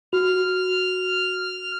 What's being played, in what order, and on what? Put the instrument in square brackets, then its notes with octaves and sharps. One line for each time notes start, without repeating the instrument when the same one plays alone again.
[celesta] F#4 [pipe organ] F6